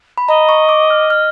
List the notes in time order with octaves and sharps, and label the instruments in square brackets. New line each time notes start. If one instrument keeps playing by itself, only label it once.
[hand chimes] B5
[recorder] D#5 [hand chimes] A#5
[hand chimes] C#6
D6
F6
F6